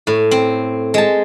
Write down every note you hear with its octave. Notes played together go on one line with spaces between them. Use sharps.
A2
C4
G#3 A5